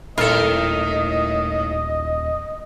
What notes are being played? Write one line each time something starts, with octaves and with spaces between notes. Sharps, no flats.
D#1 A2 D#3 F4 A4 A#4 D#5